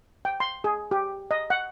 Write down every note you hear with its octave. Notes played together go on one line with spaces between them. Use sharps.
G5
C6
G#4
G4
D#5
F#5